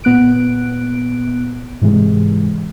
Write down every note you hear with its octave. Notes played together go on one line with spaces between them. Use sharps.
A#2 B3 F#6 D7
G#2 C3 E3 G#3